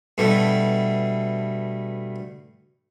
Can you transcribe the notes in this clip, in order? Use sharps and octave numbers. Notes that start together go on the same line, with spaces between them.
G2 B2 A3